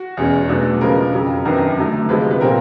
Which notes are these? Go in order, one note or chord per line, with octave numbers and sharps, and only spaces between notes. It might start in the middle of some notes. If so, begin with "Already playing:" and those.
Already playing: F#4
E2 B2 G#3 C#4
B2 F#3 A3 D4
C#3 F3 G#3 B3 A#4
F2 C#3 F#3
F#2 D#3 F#3 B3 D4 A#4
D3 F#3 A3
C3 F3 G#3 B3 B4
B4
A#2 G3 C4 A#4